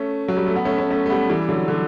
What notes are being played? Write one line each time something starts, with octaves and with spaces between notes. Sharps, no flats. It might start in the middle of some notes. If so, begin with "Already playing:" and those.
Already playing: A3 C#4
F#3
G3
A3
B3
A3 C#4
A3 C#4
A3 C#4
A3
G3 B3
E3 G3
D3 F#3
D3 F#3